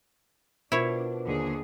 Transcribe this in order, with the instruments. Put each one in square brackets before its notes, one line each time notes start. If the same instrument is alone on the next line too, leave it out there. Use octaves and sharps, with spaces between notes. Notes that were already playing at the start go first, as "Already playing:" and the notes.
[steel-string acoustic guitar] B2 [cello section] D4 [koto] E4 C#5 [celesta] F4 A#4 C5
[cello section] D#2 D3 G#4